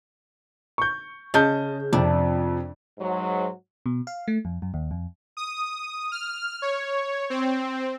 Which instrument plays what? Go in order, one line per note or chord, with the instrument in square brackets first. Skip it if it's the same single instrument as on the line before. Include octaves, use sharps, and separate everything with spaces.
[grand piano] C#6 G6
[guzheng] C#3 [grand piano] D#5 A5 G6
[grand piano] F2 C3 [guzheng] D4
[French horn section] G#2 F#3
[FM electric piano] B2
F5
A3
F2
F#2
D#2
F2
[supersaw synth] D#6
F6
C#5
C4